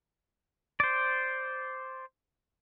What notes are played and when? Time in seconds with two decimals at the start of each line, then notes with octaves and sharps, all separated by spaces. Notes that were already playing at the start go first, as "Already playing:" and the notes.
0.80 C5 D5